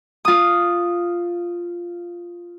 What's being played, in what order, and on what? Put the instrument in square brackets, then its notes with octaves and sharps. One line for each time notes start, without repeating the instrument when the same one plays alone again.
[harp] F4 D#6